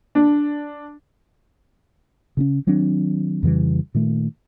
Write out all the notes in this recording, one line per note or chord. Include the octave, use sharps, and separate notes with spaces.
D4
C#3 C4 C#4
D#3 F#3 C4 D4
F2 C#3 E3 G3
A#2 D#3 A3